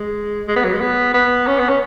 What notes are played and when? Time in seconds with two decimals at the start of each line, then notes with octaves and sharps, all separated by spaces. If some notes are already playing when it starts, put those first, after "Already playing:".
Already playing: G#3
0.48 G#3
0.56 B3
0.65 F#3
0.73 G#3
0.81 B3
1.14 B3
1.47 C#4
1.59 B3
1.69 C#4